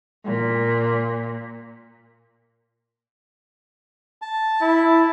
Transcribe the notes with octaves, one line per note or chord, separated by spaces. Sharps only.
A#2
A5
E4